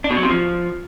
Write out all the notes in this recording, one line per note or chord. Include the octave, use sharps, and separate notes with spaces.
D4
B2
F#3
C3
F3